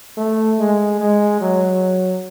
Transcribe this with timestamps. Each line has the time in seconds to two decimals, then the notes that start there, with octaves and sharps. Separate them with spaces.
0.17 A3
0.59 G#3
1.01 G#3
1.41 F#3